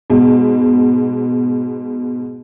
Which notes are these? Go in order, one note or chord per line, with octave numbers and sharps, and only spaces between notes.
G#2 B2